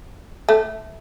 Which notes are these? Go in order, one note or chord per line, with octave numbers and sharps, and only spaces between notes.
A3